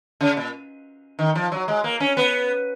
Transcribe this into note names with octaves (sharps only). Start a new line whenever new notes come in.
C#3
A#2
D#3
F3
F#3
G#3
A#3
C#4
B3